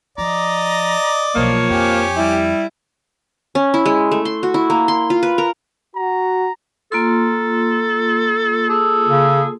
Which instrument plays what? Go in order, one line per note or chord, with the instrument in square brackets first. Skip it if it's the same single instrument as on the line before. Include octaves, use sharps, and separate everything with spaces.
[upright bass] F3 [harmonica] D5 D#5 [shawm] A#5
[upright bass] B1 [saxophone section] F3 A#3 [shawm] C#5
[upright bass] F2 [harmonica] G4 G#5
[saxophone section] G3 E4
[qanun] C#4
E4
G#3
A3
C6
F#4
E4
A#3
C6
F4
B4
A#4
[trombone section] F#4 [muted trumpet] A#5
[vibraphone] A#3 F4 C6 [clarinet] A4
[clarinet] G#4 [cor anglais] A4
[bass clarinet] C#3